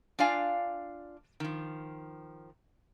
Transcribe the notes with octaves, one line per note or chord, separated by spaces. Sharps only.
D4 F4 D5 F5 G#5
D#3 F3